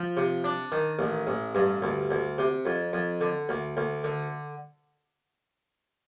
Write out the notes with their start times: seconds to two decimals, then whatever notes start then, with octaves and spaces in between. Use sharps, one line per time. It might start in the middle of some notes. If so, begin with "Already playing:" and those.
Already playing: F3
0.17 C3
0.44 D4
0.72 D#3
0.99 A1
1.27 A1
1.55 G2
1.82 D2
2.11 D2
2.38 C3
2.65 F2
2.93 F2
3.21 D3
3.49 D2
3.77 D2
4.04 D3